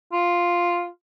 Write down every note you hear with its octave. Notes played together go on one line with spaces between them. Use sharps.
F4